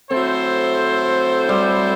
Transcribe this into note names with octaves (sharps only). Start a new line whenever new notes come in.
F#3 A3 C4 E4 A4 C5
G3